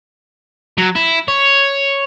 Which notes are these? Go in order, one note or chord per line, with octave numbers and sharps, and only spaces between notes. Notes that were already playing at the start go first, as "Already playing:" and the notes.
F#3
E4
C#5